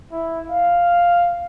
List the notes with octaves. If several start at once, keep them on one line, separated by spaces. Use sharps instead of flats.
E4
F5